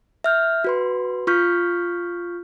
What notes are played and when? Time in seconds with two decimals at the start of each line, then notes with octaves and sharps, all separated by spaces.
0.24 E5 F6 G6
0.64 F#4 B4 C6
1.27 F4 C#6 F6 G6 B6